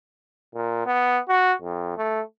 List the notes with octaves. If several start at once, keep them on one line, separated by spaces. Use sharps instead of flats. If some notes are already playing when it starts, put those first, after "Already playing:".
A#2
B3
F#4
F2
A3